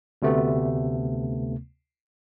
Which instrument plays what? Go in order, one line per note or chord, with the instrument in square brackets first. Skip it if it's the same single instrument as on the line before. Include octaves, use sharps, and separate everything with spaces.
[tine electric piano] D2 C3 A3 B3